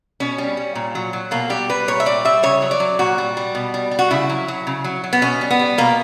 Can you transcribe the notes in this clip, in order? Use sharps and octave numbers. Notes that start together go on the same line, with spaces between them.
B2 C#4
G3
G3
A#2
F#3
F#3
B2 A#3
G3 G4
G3 B4
A#2 C#5
E5
G3 D5
G3 E5
C#3 C#5
F#3
D5
F#3
A#2 F#4
G3
G3
B2
G3
G3
F#4
C#3 E4
F#3
F#3
C#3
F#3
F#3
B3
B2 C#4
G3
B3
G3
B2 A#3